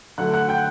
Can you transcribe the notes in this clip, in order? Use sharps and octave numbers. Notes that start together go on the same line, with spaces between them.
D3 F#3 A3 F#5 F#6
F#5 F#6
G5 G6